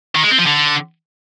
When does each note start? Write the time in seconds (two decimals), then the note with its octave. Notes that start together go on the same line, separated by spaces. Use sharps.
0.15 D#3
0.23 G#3
0.31 C4
0.38 F3
0.46 D3